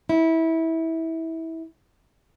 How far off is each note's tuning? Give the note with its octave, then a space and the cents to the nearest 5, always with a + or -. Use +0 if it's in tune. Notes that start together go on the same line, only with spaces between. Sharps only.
E4 -20